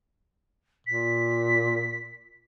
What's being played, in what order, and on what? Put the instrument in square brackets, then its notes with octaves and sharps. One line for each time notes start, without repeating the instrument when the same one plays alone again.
[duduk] A#2 [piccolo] B6